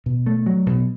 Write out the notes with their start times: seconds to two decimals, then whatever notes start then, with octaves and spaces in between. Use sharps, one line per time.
0.06 B2
0.26 A3
0.46 F#3
0.66 B2